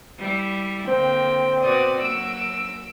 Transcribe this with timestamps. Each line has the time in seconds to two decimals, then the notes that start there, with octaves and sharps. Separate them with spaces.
0.18 G3 E4
0.88 D3 A#3 C4 G5
1.61 B2 F#4 B4 D5 D#6
2.01 F#3 A#3 F#4 E6 D7